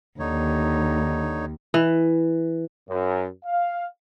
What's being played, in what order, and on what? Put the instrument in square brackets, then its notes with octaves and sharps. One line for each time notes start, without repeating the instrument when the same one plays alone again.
[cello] D#2 [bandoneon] D3 D#4 C#5
[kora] E3
[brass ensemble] F#2
F5